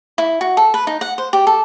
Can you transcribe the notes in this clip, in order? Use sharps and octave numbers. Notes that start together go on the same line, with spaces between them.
E4
F#4
A4
B4
D#4
F#5
C5
G4
A4